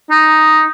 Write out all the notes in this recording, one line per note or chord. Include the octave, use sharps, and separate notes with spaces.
D#4